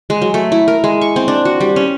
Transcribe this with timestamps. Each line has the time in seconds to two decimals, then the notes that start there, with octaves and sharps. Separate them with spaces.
0.10 G#3
0.22 F#3
0.34 A3
0.52 E4
0.68 A#4
0.84 G#3
1.01 C#6
1.16 C4
1.28 D4
1.45 F#4
1.60 G3
1.76 C#4